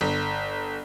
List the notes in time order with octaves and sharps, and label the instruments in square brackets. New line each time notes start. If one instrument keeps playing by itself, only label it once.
[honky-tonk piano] G1